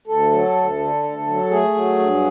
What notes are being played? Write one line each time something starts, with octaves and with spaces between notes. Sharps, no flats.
D2 A4
F#3
D2
D3
D2
F#3
A3 G#4
F#3
G2